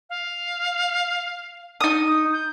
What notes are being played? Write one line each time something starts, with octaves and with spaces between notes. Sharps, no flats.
F5
D#4 D#6 D#7
G6